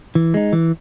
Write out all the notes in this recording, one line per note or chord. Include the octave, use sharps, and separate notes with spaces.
E3
G#3 D#4
E3